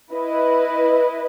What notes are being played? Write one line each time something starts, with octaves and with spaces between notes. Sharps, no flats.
E4 B4 D#5